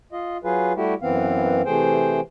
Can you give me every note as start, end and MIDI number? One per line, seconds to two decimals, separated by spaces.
0.12 0.37 65
0.12 0.37 75
0.44 0.73 54
0.44 0.73 65
0.44 0.73 68
0.44 0.73 71
0.76 0.94 55
0.76 0.94 57
0.76 0.94 64
0.76 0.94 66
0.76 0.94 67
1.02 1.62 42
1.02 1.62 52
1.02 1.62 59
1.02 1.62 60
1.02 1.62 77
1.66 2.20 48
1.66 2.20 52
1.66 2.20 57
1.66 2.20 68
1.66 2.20 72
1.66 2.20 79